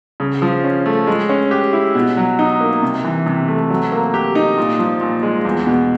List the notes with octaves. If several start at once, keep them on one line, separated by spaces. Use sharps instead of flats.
C#3
F3
C#4
A3
G#3
C#4
G4
E4
B2
F#3
D#4
A#3
C3
E3
C3
A3
F#3
A#3
G4
D#4
A#2
F3
A#2
G#3
E2
B2